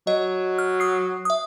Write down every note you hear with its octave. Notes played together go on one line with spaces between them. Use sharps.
F#3 D#5
F6
D#6 C7
E5 D#6